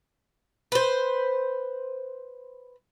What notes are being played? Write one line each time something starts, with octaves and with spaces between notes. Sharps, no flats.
B4 C5